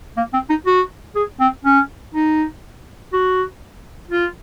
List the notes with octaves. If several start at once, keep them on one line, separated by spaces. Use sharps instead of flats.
A#3
C4
D#4
F#4
G#4
C4
C#4
D#4
F#4
F4